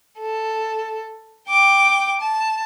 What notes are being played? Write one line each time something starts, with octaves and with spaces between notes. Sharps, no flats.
A4
G5 D6
A5